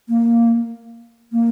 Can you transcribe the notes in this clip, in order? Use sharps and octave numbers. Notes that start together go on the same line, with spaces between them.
A#3
A#3